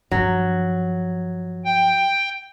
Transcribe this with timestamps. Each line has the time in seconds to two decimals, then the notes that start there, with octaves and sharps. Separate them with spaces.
0.11 G2 F3 F#3
1.65 G5